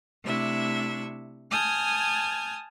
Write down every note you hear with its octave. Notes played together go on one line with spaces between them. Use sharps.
C3 A3 D4 E4 E5 C#6
G#5 A5 D#6 F6 G6 G#6